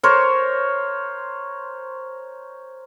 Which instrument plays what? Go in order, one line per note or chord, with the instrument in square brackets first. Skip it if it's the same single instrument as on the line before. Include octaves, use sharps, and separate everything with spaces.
[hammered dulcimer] A#4 C5 C#5